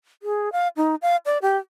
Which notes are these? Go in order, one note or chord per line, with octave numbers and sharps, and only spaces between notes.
G#4
F5
D#4
F5
D5
G4